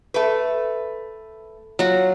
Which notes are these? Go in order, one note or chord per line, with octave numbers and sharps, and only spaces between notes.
A3 B4
F#3 F4 F#4